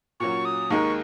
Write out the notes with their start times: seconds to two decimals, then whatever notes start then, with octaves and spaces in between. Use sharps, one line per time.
0.20 A#2 F#3 C#4 F#4 C#6
0.45 D#6
0.70 D#2 D#3 G#3 D#4 A#4 C#6